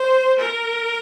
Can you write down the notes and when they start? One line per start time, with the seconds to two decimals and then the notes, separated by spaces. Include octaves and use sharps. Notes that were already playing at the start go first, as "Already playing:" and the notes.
Already playing: C5
0.39 A#4